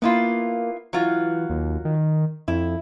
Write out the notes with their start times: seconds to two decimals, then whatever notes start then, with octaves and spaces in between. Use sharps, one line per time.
0.02 A#3 B3 E4 F4
0.93 E3 F#3 F4 F#4
1.50 D#2
1.85 D#3
2.48 F2 E4